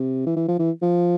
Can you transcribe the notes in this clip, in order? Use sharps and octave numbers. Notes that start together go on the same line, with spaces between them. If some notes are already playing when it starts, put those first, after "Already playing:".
Already playing: C3
E3
E3
F3
E3
F3